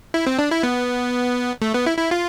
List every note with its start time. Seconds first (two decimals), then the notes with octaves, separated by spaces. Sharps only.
0.14 E4
0.27 C4
0.39 D4
0.51 E4
0.63 B3
1.62 A3
1.74 B3
1.86 E4
1.98 E4
2.11 F4